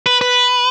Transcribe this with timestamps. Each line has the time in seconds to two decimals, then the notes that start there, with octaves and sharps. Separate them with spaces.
0.06 B4
0.21 B4